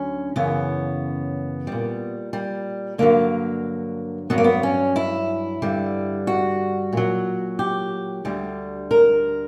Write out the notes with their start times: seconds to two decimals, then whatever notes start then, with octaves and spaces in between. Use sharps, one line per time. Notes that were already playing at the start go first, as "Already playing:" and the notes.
Already playing: D2 D3 F#3 C#4
0.36 F#2 C#3 E3 B3
1.67 A#2 G3
2.33 G3
2.98 G2 D3 F#3 A#3
4.30 G2 F#3 B3
4.38 A#3
4.44 B3
4.63 C#4
4.96 E4
5.62 G2 D3 G3
6.27 F#4
6.93 A#2 F#3
7.59 G4
8.25 D2 D3 G3
8.91 A#4